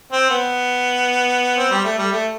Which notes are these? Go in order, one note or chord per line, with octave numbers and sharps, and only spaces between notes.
C4
B3
C4
G3
A3
G3
A3